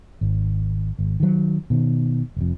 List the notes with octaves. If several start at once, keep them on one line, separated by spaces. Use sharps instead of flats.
G#1
G#1
D#3 F#3
B2 D#3
F1 F2